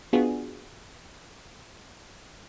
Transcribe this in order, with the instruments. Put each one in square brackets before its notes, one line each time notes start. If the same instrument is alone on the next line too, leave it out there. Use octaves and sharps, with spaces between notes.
[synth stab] B3 D4 F4 F#4 G#4